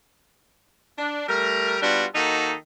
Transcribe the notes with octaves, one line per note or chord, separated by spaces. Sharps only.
D4
G3 A3 A#4
G3 B3 D4 F4 F#4
D#3 A#3 D#4 F#4 A4